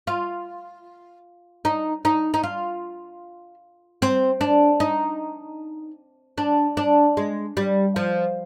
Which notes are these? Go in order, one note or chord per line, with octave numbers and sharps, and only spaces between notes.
F4
D#4
D#4
D#4
F4
C4
D4
D#4
D4
D4
G#3
G3
F3